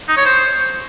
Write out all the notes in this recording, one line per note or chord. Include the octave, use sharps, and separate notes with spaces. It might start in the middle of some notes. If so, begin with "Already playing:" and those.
D#4
C#5
C5